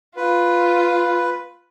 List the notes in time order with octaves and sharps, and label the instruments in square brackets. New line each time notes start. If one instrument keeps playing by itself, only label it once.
[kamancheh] F4 [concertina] B4